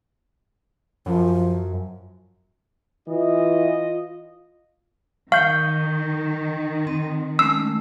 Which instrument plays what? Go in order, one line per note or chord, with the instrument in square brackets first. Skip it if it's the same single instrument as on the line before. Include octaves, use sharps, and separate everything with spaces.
[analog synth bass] F#2 [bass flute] F3
[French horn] E3 [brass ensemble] F4 D#5
[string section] D#3 [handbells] F5 [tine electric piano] C#6 G6
[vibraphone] C4
[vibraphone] G#3 A3 C#4 [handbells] E6